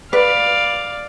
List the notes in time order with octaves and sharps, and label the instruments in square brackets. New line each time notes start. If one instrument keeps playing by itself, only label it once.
[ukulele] B4 [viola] D5 F5